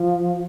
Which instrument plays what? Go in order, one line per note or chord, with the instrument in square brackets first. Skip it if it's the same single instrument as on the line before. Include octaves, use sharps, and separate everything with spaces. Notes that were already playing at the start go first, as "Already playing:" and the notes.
Already playing: [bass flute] F3